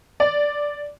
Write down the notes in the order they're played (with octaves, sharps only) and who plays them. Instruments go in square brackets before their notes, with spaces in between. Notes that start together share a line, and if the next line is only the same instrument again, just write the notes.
[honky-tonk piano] D5